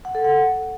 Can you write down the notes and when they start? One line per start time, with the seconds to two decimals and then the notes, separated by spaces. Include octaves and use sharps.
0.05 F#5
0.15 A4
0.25 F#5